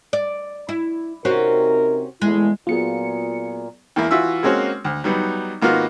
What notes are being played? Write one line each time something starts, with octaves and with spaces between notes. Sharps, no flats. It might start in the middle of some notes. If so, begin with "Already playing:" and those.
D5
E4
C3 C4 C#4 D#4 F#4 A#4
E2 G#3 A3 E4
A#2 F#3 B3 F4 G#4 C#7
E2 A#3 E4
E3 F4 F#4 E5 E6
G#3 A#3 C4 C#4 F#4
D2
F#3 G3 B3 D#4
G#1 A#3 B3 F4 F#4 F6